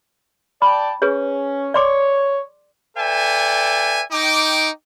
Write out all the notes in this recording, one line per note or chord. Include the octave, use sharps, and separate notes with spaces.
D5 G5 A5 B5
C#4 G#4 B4 C#5
C#5 D5 C6 D6
A4 B4 D5 E5 G5 G#5
D#4 G5 D6